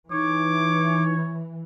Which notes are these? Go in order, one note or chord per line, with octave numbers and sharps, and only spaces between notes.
E3 D#4 C#5 D6